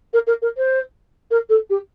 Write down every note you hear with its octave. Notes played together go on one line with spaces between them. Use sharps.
A#4
A#4
A#4
C5
A#4
A4
G4